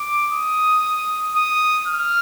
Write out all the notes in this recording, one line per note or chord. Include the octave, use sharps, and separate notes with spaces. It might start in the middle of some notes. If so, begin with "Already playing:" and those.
Already playing: D6
D#6
D#6
F6